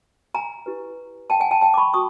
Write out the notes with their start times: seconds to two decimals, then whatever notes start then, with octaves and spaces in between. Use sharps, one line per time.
0.35 G#5 A#5
0.66 E4 G4 B4
1.30 G5 A5
1.40 F#5 G#5
1.51 G5 A5
1.62 G5 A5
1.74 D6
1.78 B5 C#6
1.94 F#4 C#6 D#6